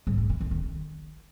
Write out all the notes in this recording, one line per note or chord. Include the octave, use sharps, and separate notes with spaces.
G#2
G#2
D#3
E3
D#3